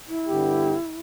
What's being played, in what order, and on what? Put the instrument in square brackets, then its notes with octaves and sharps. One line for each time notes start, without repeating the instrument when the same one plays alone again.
[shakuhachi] E4
[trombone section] G2 D3 B3 G4